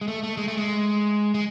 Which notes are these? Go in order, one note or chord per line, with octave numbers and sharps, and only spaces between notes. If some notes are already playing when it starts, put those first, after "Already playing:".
G#3
A3
A3
G#3
A3
G#3
G#3